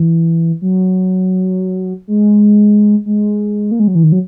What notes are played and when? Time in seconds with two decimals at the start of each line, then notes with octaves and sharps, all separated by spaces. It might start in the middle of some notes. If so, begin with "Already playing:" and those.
Already playing: E3
0.62 F#3
2.08 G#3
3.06 G#3
3.71 A#3
3.79 G#3
3.88 F#3
3.95 E3
4.04 D#3
4.12 F#3